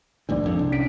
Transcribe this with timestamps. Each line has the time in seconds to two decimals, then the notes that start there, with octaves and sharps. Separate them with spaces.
0.29 A#1 D#2 G#2 D4 D5
0.44 A#1 F2
0.59 C2
0.72 C#4 B6 D7